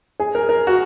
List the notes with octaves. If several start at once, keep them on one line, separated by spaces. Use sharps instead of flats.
G#4
A#4
A#4
F#4